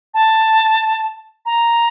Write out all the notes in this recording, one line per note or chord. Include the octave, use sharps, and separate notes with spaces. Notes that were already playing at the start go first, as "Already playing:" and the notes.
A5
A#5